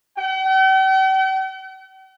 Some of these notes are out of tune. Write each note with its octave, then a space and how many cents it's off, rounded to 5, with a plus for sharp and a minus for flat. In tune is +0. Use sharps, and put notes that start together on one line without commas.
G5 -45